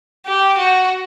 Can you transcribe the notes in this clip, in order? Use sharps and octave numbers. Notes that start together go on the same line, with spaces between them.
G4
F#4